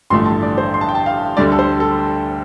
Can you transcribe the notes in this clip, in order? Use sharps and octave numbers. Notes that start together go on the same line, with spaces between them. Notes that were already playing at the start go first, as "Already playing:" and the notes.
A1 G2 D3 F3 A3 C6
A5
D5
C5
C6
A5
G5
A5
F5
D2 D3 G3 D5
A4
C5
A4